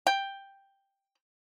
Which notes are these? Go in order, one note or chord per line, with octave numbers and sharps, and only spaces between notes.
G5